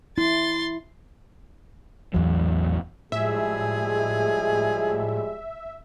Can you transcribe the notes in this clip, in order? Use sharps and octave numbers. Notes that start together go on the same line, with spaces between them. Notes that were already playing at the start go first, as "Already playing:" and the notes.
E4 C6 A6
A1 E2 F#3
A2 F3 G3 G#3 G#4 E5